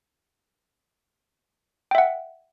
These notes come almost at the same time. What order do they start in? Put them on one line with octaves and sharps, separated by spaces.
G5 E5 F#5